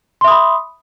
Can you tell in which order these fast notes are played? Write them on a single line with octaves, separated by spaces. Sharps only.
C6 E5 D#6 B5